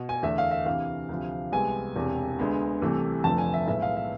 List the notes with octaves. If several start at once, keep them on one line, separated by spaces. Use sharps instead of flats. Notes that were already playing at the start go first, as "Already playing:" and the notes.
Already playing: B2
G#5
E2 D3 A3 E5
F5
E5
D2 C3 E3 F5
D2 C3 F3
C2 C3 G#3 B3 G#5
E1 E2 C3
D2 D3 G#3 B3
C2 C3 E3 A3
F1 F2 D3 F3 A3 A5
G#5
E5
B1 A2 G#3 B3 E5
F5
E5